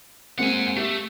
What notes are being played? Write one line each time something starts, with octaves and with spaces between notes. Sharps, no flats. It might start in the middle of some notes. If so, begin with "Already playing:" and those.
G#3 A#3 C4 F#5 G#5
A3 G4